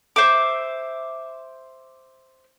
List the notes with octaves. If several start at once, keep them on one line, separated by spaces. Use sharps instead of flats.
C5 E5 D6